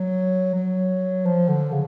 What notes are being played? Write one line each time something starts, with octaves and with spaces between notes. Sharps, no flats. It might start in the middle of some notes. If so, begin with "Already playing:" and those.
Already playing: F#3
F#3
F3
D3
C#3